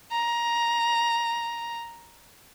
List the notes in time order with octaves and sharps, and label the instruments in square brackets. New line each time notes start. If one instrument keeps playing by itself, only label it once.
[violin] A#5